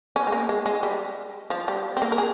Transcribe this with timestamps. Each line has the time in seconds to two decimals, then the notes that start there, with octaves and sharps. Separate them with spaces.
0.16 C#4
0.27 G#3
0.32 A#3
0.49 G#3
0.66 G#3
0.83 G3
1.50 F3
1.68 G3
1.97 C4
2.02 A#3
2.12 A#4
2.18 G#4